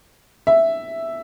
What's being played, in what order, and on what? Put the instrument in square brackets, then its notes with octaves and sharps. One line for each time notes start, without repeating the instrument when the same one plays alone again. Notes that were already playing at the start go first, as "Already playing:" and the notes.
[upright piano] E5